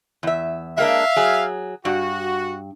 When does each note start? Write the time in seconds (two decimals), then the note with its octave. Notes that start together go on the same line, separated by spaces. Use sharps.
0.23 E2 E5
0.78 G#3 A#3 D4 E5 F5
1.16 F#3 G#4
1.85 G2 F#4